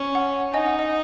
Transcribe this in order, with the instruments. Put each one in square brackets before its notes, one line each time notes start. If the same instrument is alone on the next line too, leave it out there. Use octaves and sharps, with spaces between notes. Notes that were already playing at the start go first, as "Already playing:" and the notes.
Already playing: [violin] C#4
[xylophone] F#5
[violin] D#4 [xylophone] D#5 G#5
[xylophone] F#5
D#5